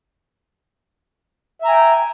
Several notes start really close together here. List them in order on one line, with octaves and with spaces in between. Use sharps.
E5 A#5 G#5 G5